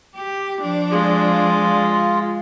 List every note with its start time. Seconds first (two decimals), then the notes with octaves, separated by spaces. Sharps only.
0.16 G4
0.61 F3 D4
0.91 G#3 F4